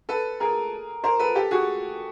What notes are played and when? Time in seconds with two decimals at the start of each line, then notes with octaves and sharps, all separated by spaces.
0.09 A4 B4
0.40 G#4 A#4
1.04 A#4 C5
1.19 A4 B4
1.35 G4 A4
1.51 F#4 G#4